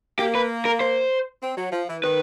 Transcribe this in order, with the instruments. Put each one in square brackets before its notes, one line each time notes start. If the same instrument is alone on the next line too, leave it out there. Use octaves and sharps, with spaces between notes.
[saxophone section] A#3 [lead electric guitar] G4
[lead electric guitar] B4
A#4
C5
[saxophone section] C4
F#3
F3
E3
[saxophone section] D#3 [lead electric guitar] B4